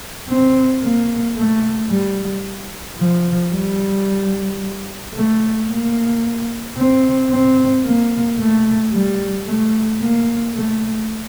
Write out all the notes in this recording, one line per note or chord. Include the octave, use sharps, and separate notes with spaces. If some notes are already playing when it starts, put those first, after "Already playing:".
C4
A#3
A3
G3
F3
G3
A3
A#3
C4
C4
A#3
A3
G3
A3
A#3
A3